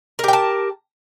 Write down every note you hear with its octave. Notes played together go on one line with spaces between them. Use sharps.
G4 A#4 G5 A5